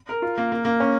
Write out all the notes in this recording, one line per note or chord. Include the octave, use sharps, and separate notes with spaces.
A#4
F4
A#3
A#3
A#3
C#4